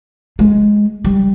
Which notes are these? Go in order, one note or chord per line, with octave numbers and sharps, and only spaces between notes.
G#3
G3